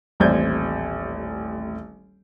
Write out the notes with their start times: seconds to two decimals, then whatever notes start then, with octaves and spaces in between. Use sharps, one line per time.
0.20 D#1 A1 C4 D5 G6 G#6